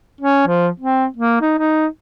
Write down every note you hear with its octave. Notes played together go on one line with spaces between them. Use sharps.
C#4
F3
C4
A#3
D#4
D#4